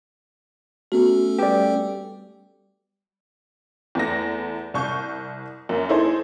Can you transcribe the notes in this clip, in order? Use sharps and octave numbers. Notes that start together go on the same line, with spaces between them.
A3 B3 C#4 F#4 A4
G3 G4 B4 D5
E2 A3 A#6
C2 C#6 G6
F#2 A#3
D#4 E4 G#4 A4 C5